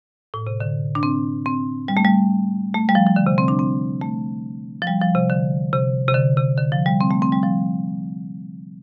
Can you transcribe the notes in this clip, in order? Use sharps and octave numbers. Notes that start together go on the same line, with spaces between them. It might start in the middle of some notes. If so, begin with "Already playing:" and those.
A2
C3
D3
D4
C4
C4
G3
A3
G3
A3
G3
F3
F3
D3
C3
C4
D4
C4
A3
F3
G3
F3
C3
D3
C3
C3
D3
C3
D3
F3
G3
C4
A3
C4
G3
F3